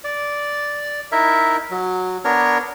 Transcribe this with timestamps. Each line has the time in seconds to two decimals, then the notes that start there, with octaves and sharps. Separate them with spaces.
0.04 D5
1.12 D#4 E4 A#4 E5
1.70 F#3
2.25 B3 D4 A#4 C#5